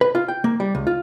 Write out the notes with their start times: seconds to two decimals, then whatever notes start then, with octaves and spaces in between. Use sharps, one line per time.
0.01 B4
0.15 F4
0.28 G5
0.44 A#3
0.60 G3
0.75 C#2
0.87 F4